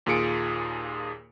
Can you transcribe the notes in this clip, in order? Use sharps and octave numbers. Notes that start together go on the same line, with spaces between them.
D#2 A#2 F4 G#4 C#7 D7